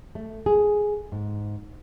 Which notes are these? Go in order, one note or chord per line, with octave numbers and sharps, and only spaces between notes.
A3
G#4
G#2